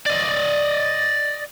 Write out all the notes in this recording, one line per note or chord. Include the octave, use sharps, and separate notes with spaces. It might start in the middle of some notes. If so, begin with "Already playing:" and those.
D5 D#5